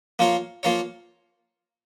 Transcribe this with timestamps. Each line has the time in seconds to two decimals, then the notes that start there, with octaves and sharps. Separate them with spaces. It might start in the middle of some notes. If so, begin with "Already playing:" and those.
0.19 F3 A#3 F4 A#4 C#5
0.63 F3 A#3 F4 A#4 C#5